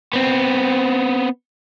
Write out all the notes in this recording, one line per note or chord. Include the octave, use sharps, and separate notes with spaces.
B3 C4